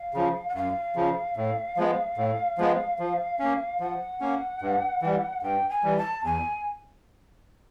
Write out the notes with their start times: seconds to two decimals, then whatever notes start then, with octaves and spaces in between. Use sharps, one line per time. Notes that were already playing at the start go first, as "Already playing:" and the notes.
Already playing: F5
0.14 C#3 F3
0.48 F#5
0.55 F#2 F5
0.95 C#3 F3
1.36 A2
1.77 F3 G#3 B3
2.17 A2
2.58 F3 G#3 B3
2.99 F3
3.39 A#3 C#4
3.80 F3 F#5
4.21 A#3 C#4
4.62 G2
5.02 E3 G3
5.42 G2 G5
5.69 G#5
5.83 E3 G3
5.97 A5
6.24 E2 G#5